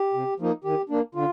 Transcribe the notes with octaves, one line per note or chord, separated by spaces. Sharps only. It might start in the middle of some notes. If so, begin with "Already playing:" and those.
Already playing: G4
C3
F3 A#3 D#4
D#3 G4
A#3 D4
D3 F4